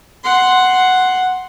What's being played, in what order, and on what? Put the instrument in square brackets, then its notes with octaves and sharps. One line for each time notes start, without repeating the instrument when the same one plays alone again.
[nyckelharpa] F#5 C6